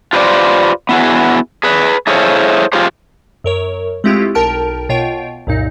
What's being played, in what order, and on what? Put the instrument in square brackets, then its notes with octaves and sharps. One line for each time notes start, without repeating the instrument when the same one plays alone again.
[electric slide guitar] F4 G4 B4 C5 D5
B3 E4 F#4 G#4
G#4 B4
E4 G#4 A4 C5 C#5 F5
F4 G4 G#4 C5
[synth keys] F#2 A#4 C#5
G#3 A3 C4 E4 F4 G4
B1 A#4 G5 A5 F6 D7
B2 F4 C#5 G5 D7
C2 F#2 A#2 D#4